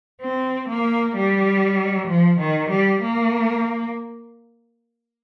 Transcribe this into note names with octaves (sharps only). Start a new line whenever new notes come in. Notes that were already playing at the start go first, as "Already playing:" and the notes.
C4
A#3
G3
F3
D#3
G3
A#3